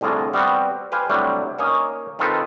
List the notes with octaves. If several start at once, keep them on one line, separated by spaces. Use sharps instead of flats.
C2 A2 D3 F4 G#4 A#5
G3 B3 C4 F#4 C5
G4 B4 C5 F5 G#5
A2 C3 F#3 G3 D4
A#3 C#4 D#4 A#4 C#5 D#5
D#3 F3 C4 F4 A4 B4